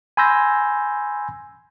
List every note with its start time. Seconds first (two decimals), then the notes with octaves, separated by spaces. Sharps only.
0.17 G#5 B5 C6 E6 G6 A#6